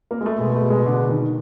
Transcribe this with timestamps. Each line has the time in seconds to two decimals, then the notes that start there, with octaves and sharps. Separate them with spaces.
0.11 A#3
0.21 G#3
0.26 A3
0.40 B2 G#3
0.56 A3
0.70 G#3
0.86 D3
1.09 D#3